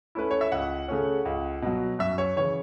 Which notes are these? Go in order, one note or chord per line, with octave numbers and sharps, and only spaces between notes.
A3 C#4 E4 B4
C#5
E5
C#2 F#5
C#3 A3 C#4
C#2
B2 F#3
F#2 E5
C#5
C#3 E3 C#5